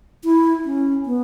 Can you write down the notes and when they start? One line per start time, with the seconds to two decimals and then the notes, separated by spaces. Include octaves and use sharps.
0.24 E4
0.65 C#4
1.06 B3